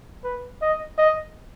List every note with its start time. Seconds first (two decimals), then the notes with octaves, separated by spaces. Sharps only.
0.24 B4
0.62 D#5
0.98 D#5